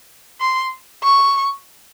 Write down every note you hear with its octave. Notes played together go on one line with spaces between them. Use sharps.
C6
C#6